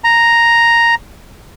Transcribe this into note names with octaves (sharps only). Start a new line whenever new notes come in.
A#5